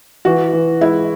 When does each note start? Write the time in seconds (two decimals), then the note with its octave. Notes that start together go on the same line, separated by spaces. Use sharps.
0.25 E3 F#4
0.53 E3
0.81 G#3 E4